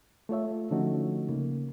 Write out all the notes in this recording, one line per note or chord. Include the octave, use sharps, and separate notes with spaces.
A3 F4 C#5 E5
D3 F3 A3 C#4 D#4 F#4
C#3 A#3